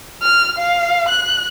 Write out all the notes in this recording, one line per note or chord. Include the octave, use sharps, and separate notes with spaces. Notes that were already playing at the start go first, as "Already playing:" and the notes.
F6
F5
F#6